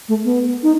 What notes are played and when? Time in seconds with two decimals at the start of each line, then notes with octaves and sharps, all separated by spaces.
0.09 A3
0.24 B3
0.63 D#4